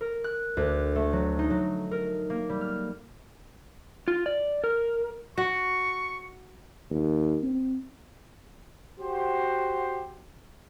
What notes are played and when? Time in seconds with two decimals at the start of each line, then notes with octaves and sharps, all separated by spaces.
0.01 A#4
0.24 F#6
0.57 D2
0.96 A3
1.13 F#3
1.39 D#4
1.50 F#3
1.91 A#4
2.30 A#3
2.49 G3
2.61 F6
4.08 F4
4.26 D5
4.64 A#4
5.38 F#4 C#6
6.91 D#2
7.43 C4
8.99 F#4 G4 C5